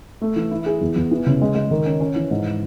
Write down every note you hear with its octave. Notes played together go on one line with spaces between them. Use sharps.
A3
E3
E4
G#4
E2
E2
E3
C#3
G#3
G#3
D#3
C#4
C#4
E3
G#2